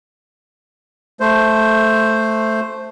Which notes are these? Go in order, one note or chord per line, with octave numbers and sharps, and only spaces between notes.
A3 C5